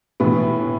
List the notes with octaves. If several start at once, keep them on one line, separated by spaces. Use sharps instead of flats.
A2 E3 B3